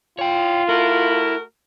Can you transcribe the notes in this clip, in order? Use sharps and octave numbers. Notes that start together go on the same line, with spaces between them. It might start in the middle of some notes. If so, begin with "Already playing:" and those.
F4 C#5 G5
A3 E4 F#4 A#4